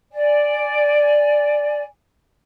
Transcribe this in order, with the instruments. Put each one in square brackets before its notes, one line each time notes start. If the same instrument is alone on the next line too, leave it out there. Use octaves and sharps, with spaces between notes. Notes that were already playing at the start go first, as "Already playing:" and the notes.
[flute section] D5 G#5